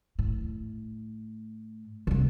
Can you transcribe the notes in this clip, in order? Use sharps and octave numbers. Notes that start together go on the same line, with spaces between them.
A2
C2 D3